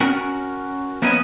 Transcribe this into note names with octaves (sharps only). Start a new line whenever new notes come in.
C#4 F#4 A#4
F3 A#3 B3 C#4 E4 D#5